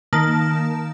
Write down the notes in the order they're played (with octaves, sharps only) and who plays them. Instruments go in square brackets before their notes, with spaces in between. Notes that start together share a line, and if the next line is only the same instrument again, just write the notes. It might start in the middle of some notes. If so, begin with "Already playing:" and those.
[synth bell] D#3 A#3 A5